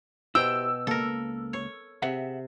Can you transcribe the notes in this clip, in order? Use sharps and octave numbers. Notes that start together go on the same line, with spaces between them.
B2 E4 G4 C5 G5 E6
C#2 A#3 A4 A#4
C#5
C3 G#4 E5 F#5